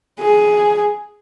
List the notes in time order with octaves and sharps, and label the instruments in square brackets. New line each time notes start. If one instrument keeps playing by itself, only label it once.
[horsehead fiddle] G#4